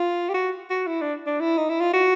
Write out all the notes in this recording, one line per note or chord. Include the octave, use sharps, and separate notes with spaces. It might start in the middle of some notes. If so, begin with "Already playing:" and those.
Already playing: F4
G4
F#4
F#4
E4
D4
D4
E4
D#4
E4
F4
F#4